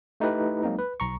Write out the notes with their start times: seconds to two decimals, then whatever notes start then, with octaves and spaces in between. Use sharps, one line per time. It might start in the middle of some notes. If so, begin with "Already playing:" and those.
0.20 A3 D#4 E4 G4 B4
0.63 F#3 G#3 A#3 C4 D#4
0.79 B4
1.00 B1 A#5 C#6